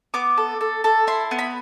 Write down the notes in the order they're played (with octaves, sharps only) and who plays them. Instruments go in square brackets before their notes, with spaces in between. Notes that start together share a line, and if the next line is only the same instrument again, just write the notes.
[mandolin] B3 D6
A4
A4
A4
E4 C6
B3
B5